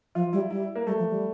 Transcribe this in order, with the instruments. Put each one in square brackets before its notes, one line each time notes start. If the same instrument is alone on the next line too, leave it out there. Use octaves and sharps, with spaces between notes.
[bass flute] F3 [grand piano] F4
[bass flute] G3 [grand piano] E4
[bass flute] G3 [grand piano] E4
[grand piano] A#3
[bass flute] G3 [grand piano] A3
[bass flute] F3
G3